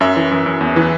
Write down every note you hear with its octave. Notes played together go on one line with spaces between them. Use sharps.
F#2 E5
E3
F#2
F#2
E2
E3